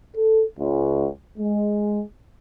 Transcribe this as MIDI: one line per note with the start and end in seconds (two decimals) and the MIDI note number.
0.16 0.43 69
0.59 1.07 37
1.38 2.02 56